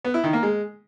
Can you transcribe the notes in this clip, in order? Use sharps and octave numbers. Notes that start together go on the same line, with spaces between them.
B3
E4
D#3
A#3
G#3